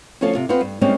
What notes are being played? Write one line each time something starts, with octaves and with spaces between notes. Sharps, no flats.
D2 F3 C#4 F4 A4 A5
C3 F4
B3 C4 F4 B4 C5
G2
G3 G#3 A#3 C4 C#4 D#4